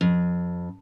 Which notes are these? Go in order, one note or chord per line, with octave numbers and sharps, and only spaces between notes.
F2